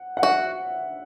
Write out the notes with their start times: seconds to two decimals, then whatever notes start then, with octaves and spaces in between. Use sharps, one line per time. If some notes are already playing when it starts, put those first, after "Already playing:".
Already playing: F#5
0.17 F#5
0.22 F#4 E5